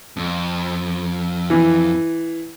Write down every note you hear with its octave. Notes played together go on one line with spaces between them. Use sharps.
F2
E3